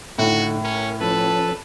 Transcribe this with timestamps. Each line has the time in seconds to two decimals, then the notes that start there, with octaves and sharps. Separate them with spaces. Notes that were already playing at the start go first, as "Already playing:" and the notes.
0.18 A2 D3 D#4 F#4
0.64 C#4 A#4
1.01 F3 C#4 A4 B4 A5